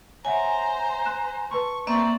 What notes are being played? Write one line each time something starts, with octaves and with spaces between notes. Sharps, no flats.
C5 C#5 E5 F#5 G#5 A#5
F#6 E7
B4 A5 C6 C#6
A#3 C4 D5 E5 C#6